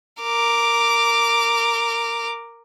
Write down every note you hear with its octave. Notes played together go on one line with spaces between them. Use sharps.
A#4 D6